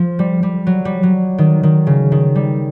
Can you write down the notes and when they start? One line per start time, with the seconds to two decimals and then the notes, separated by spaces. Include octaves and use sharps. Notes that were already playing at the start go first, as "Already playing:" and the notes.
Already playing: F3
0.19 G3
0.43 G3
0.67 F#3
0.85 G3
1.03 F#3
1.38 D#3
1.63 D#3
1.87 C#3
2.12 D#3
2.35 G3